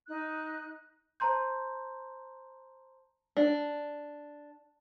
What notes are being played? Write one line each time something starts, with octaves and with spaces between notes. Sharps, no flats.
D#4 F#6
C5 A5 A#5 C6 G6
D4